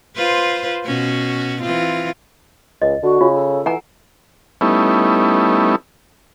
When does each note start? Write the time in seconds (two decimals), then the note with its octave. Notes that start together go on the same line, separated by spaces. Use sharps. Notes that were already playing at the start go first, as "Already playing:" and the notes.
0.16 F4 B4 C5
0.86 B2 C#4 F#4
1.62 E3 C4 F4
2.82 C#2 D#5
3.03 D3 F#4
3.21 C#3 F4
3.34 A4
3.66 E3 F#5 G#5 A#5
4.61 G3 A3 B3 C#4 D#4 E4